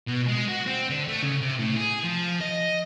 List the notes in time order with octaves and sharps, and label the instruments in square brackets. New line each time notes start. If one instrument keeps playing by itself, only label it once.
[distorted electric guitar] B2
G#3
F#4
C4
D3
A3
C#3
C3
A2
G#4
F3
D#5